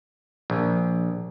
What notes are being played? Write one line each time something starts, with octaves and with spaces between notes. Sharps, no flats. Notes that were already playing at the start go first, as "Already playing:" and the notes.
A#1